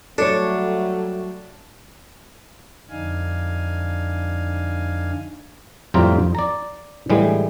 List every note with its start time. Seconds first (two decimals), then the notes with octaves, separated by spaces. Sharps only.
0.18 F#3 G3 A3 D4 A4 C#5
2.89 F2 D3 D4 D#4 F5 G#5
5.94 F2 A2 G3 F4 G5 A#5
6.19 F2
6.35 D5 A#5
7.10 A2 D3 E3 G3 G#3